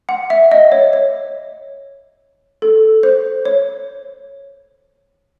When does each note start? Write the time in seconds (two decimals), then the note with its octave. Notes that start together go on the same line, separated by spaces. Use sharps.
0.09 F#5
0.30 E5
0.52 D#5
0.72 C#5
0.93 C#5
2.62 A4
3.03 C5
3.45 C#5